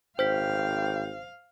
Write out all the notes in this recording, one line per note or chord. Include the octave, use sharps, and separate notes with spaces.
G#1 C5 F5 G5 G6 B6